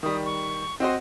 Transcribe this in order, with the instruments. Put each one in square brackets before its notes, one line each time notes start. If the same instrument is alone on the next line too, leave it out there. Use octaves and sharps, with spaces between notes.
[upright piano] D#3 G3 [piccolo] D#6
[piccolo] C#6
[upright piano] C4 F#4 C5 [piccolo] D#5